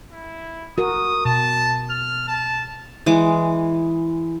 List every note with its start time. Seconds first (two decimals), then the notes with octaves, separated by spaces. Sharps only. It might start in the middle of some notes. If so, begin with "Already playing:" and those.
0.12 E4
0.78 F#4 A#4 D#6
1.25 B2 A5
1.90 F6
2.28 A5
3.06 E3 G#3 D6